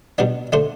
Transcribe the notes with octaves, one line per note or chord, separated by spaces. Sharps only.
B2 G3 B3 D4
D3 A3 D4 C5